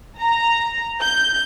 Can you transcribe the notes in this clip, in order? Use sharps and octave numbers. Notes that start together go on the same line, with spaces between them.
A#5
G6